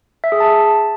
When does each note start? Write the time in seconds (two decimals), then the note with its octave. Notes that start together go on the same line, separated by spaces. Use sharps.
0.24 E5
0.32 G#4
0.40 A5